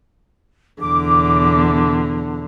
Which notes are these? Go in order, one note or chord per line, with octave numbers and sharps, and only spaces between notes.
E2 B2 D3 D6